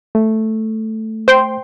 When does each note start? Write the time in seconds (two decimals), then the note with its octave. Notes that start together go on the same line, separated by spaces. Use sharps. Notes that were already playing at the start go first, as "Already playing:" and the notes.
0.15 A3
1.28 C5 G5 C6